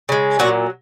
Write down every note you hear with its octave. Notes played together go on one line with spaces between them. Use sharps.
C#3 G#3
A#2 F#3 F#4